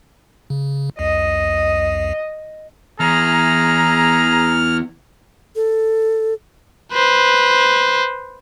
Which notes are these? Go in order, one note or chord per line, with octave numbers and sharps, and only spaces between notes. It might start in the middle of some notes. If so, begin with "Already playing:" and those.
C#3
C2 F2 D#5
E2 G#4 A#5 F6
A4
B4 C5